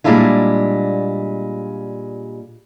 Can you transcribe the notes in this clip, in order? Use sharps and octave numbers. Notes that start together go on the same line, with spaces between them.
A#2 G3 G#3 D4 E4 F4